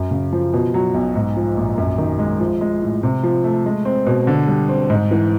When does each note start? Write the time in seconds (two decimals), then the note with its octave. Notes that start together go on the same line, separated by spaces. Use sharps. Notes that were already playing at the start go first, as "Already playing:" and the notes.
Already playing: F#2
0.11 C#3
0.33 F3
0.53 B2
0.74 F#3
0.94 B1
1.15 G#2
1.37 F3
1.57 A#1
1.78 F#2
1.98 D#3
2.19 G#3
2.40 F3
2.61 G#3
2.82 A2
3.03 C3
3.23 F3
3.44 A3
3.66 G#3
3.85 C4
4.06 B2
4.27 D3
4.48 G3
4.69 C4
4.90 G#2
5.11 E3